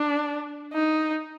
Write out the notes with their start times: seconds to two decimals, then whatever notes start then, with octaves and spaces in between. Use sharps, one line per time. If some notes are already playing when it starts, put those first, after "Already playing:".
Already playing: D4
0.73 D#4